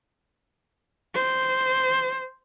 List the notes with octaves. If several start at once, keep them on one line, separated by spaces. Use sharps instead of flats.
C5